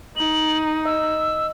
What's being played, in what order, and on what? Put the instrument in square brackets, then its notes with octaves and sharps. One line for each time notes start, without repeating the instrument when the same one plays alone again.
[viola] D#4 [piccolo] F#7
[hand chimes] D#5 [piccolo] E6